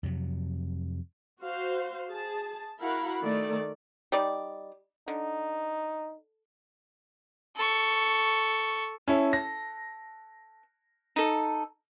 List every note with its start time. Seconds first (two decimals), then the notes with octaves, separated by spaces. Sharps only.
0.03 F2 C3 F#3
1.40 F#4 C5 F5
2.11 G#4 A5
2.80 E4 F#4 A#4 F5 F#5 B5
3.22 D#3 A3 D5
4.12 G3 D#4 D5
5.08 D3 D#4
7.56 A4 C#6
9.08 C#4 E4 A4
9.33 A#6
11.16 D#4 A4